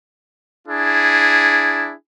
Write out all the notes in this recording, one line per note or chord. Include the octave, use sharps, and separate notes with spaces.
D4 E4 G#4